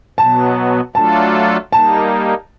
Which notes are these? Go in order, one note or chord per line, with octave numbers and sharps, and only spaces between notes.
B2 F#3 B3 A5
F#3 A3 D4 F4 A4 A5
G3 A#3 D#4 A5